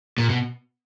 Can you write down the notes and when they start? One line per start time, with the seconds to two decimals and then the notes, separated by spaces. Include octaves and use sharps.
0.18 A#2
0.30 B2